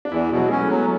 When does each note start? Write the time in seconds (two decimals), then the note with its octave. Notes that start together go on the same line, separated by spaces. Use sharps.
0.05 D4
0.12 E2 E4
0.31 B2
0.37 F#3
0.48 G#3 C#4
0.60 A3
0.69 F#3 B3